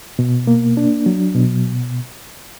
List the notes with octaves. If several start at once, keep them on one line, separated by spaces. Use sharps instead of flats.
B2
A#3
D4
F#3
B2